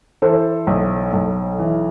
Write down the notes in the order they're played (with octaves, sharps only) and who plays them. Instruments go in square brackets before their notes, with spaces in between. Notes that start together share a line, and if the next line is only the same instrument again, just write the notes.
[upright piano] E3 A4 C5
B1
B1
E3